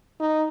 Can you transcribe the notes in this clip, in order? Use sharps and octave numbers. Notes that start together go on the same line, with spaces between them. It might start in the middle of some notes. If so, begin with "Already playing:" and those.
D#4